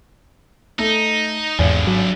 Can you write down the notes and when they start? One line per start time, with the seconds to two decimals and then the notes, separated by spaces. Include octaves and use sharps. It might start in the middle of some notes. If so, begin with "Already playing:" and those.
0.79 A3 D#4
1.59 G#1 E2 G2 D3
1.87 F#3